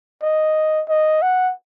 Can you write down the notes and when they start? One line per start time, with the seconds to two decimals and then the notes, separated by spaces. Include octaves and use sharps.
0.22 D#5
0.89 D#5
1.22 F#5